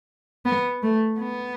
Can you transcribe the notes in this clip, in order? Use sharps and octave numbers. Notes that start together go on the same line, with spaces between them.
B3
A3
B3